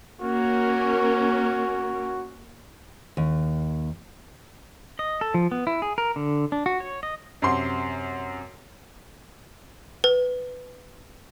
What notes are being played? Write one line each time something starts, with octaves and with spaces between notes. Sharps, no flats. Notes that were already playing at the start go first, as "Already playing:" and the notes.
A#3 C#4 F#4 A#4
D#2
D#5
A4
F3
B3
E4
G#4
A#4
D3
D4
F#4
C#5
D#5
F#2 C3 F#5 C6
B4